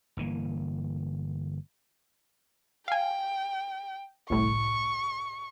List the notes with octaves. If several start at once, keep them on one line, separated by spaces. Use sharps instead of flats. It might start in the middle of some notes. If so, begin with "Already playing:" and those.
G1 E3 A#3
F5 G5 G#5
G1 C2 A2 C#6